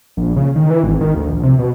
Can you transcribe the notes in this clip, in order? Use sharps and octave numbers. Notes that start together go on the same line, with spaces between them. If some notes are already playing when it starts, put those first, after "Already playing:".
A#1
C#3
D#3
E3
G#1
D#3
D2
A#1
C3
B2